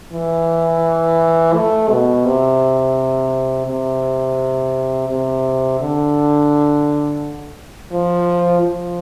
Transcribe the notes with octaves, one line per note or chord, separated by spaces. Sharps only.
E3
A3
B2
C3
C3
C3
D3
F3
F3